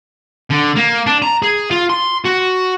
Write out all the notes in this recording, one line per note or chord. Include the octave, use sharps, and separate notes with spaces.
D3
A#3
D4
A#5
G#4
F4
C6
F#4